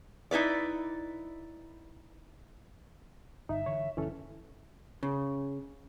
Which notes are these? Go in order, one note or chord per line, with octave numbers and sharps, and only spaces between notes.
D#4 E4 B4 D5
G1 D#4 E5
D3 E3 C#5
F#1 F2 E3 C#4 A4
C#3